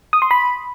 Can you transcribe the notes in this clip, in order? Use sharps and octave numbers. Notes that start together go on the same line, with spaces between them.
D#6
C6
B5